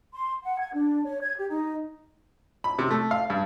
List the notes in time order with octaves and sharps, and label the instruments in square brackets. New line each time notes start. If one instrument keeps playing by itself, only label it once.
[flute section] C6
F#5
G#6
D4
C#5
G#6
G4
D#4
[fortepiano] B5
C3
A3
F5
G2